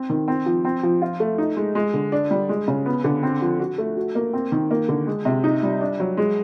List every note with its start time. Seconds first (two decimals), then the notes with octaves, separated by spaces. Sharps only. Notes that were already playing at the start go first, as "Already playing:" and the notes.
Already playing: C4
0.10 D#3
0.28 C4
0.46 F3
0.65 C4
0.83 F3
1.02 F4
1.20 A3
1.38 D#4
1.57 G#3
1.75 G#3
1.94 D3
2.12 D4
2.31 G3
2.49 G#3
2.68 C#3
2.86 B3
3.04 D3
3.23 C4
3.42 F3
3.60 F#4
3.78 A3
3.97 F#4
4.15 A#3
4.33 C4
4.52 D#3
4.71 A#3
4.88 D3
5.07 G#3
5.25 C3
5.44 D#4
5.63 G3
5.81 D4
6.00 F#3
6.17 G#3